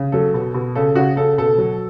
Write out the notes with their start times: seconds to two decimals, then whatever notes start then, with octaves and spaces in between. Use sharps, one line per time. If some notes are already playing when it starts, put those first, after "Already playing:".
Already playing: C#3
0.12 F#3 A4
0.34 B2
0.54 B2
0.75 C#3 A4
0.95 C#3 F#4
1.16 C#3 A4
1.38 B2 A4
1.58 F#3